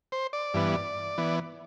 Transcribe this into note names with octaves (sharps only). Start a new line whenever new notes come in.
C5
D5
G2 E3 B3
E3 B3